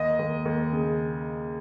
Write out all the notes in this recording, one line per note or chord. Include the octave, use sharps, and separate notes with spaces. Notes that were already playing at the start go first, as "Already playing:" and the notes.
Already playing: D#2 D#5
D#2
D#2
C#3